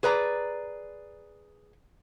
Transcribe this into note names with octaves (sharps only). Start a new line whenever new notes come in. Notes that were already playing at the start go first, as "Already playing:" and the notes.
G#4 B4 D5 A#5